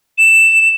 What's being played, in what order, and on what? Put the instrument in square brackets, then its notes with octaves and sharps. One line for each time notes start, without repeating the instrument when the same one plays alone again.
[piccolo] E7